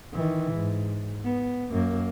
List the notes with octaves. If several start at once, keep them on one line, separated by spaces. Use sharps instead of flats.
D#3 E3
G#2
B3
F#2 A#3